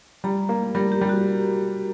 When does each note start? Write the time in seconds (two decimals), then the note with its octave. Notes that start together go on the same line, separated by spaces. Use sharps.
0.24 G3 A#5
0.49 A#3
0.75 G3 A#4
0.92 G4
1.01 G3
1.09 F#4